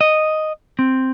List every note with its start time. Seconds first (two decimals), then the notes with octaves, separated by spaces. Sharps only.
0.01 D#5
0.79 C4